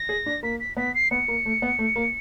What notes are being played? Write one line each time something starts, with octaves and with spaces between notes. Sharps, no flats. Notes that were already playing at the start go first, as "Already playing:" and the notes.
Already playing: A#6
G#4
D4
A#3 B6
B6
B3 B6
C7
B3 C#7
A#3
A3
B3
A3
A#3